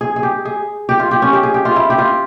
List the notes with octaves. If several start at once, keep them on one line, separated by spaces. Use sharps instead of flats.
G#4
G#4
G4
G#4
G4
F4
G4
C#4
G4
G#4
G4
F4
E4
G4
F4